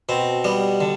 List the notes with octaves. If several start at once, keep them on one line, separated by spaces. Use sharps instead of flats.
B2 C4
G3 B3
D3